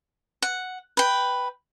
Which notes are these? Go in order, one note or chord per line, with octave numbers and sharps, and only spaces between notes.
F#5
B4 G5